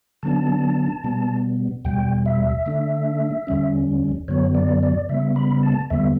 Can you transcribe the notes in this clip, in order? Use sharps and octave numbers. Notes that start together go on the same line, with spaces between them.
D3 F#3 B3 D4 A5
B2 G3 B3
E2 B2 G3 G5
E5
D3 A3 D4
E2 D3 G3 C#4
F#2 D3 F#3 B3 C#5
D5
D5
C#3 G3 B3 E5
B5
A5
E2 D3 G3 B3 E5